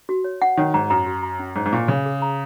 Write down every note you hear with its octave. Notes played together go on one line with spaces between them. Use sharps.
F#4
C#5
F#5
D#3 C#5
G#2 A#5
F#2 A#5
F#4
A#5
C#4
G#2 C#5
G#2
A#2 C#6
C#3 G#5
G#4
A#5